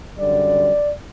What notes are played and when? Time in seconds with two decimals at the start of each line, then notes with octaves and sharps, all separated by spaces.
0.18 F#2 D3 G3 D5